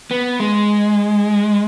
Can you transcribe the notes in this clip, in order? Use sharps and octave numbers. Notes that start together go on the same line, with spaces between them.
B3
G#3